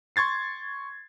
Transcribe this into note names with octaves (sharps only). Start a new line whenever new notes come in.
C6 C#6 G#6 A6 C7